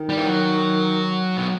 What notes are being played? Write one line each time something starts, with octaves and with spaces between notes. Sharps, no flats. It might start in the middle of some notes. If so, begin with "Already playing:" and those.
Already playing: D#3
G3
E3
F#3
B2